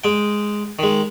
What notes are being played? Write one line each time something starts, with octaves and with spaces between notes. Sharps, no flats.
G#3 G5
D#3 G#3